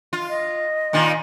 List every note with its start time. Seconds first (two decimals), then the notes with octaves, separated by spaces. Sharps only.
0.13 F4
0.29 D#5
0.93 A#2 D#3 F4